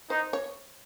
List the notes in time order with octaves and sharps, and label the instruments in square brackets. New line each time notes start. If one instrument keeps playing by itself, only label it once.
[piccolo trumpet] D#4 [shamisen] C5
[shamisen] C#5